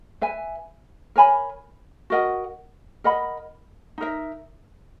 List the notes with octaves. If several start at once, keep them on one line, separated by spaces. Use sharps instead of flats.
B4 E5 G#5
A#4 C#5 G#5 B5
F#4 A#4 D#5 F#5
A#4 D#5 F#5 B5
D#4 A#4 E5